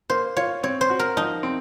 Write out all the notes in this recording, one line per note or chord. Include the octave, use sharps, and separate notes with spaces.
A#3 C5
F4 C#5
C4 C#5
C5
F#4
A#4
F3 D#4
C4